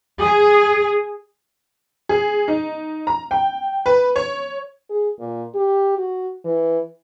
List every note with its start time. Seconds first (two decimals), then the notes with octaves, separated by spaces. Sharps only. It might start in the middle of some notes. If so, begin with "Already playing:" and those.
0.22 G#4
2.09 G#4
2.48 D#4
3.07 A#5
3.31 G5
3.86 B4
4.16 C#5
4.90 G#4
5.19 A#2
5.55 G4
5.98 F#4
6.45 E3